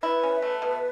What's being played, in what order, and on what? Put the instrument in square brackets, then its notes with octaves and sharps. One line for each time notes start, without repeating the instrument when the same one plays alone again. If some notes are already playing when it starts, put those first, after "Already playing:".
[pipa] E4 [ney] B4
[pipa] C#4
A3
B2